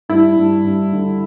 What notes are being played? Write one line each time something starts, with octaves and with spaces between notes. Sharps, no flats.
G2 E4
G2
G2
D3